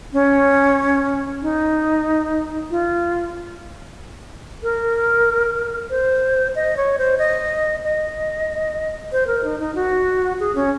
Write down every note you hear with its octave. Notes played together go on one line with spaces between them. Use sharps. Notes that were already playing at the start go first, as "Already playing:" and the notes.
C#4
D#4
F4
A#4
C5
D#5
C#5
C5
D#5
D#5
C5
A#4
D#4
D#4
F#4
G#4
C#4